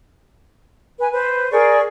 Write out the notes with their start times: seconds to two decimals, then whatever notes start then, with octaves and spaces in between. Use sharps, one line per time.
1.00 B4 G#5
1.12 B4 C5
1.51 G#4 A#4 D5 C#6